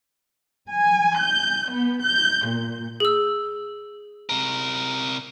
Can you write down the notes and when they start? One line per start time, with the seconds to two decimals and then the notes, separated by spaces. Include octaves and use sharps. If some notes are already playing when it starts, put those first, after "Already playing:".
0.70 G#5
1.17 G6
1.69 B3
2.05 G6
2.48 A#2
3.00 G#4 E6
4.29 C3 A#4